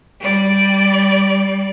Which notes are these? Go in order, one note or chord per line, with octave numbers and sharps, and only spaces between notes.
G3 D5